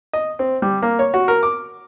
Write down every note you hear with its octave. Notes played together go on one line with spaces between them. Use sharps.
D#5
C4
G3
A#3
C#5
F#4
A#4
D6